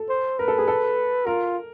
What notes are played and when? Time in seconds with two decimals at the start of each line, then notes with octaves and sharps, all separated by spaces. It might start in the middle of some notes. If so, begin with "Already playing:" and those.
Already playing: A4
0.09 C5
0.38 A#4 B4
0.48 A4
0.58 G#4
0.68 A4
1.27 F4 A#4